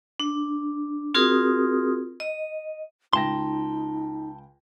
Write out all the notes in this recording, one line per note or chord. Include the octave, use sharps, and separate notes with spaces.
D4
C4 F4 F#4 G#4 A#4 D#6
D#5
C#2 D#4 G5 A5 C6 A#6